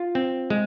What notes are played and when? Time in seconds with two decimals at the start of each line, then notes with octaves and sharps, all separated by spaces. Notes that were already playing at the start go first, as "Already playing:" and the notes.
Already playing: F4
0.15 C4
0.50 G#3